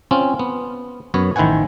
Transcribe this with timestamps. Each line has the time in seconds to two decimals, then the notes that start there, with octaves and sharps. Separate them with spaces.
0.11 C4 C#4 F4
0.39 B3
1.14 F#2 B3 C#5
1.36 A1 D#3 E4 C5 F#5 G#5